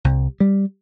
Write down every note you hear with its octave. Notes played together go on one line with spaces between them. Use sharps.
C2
G3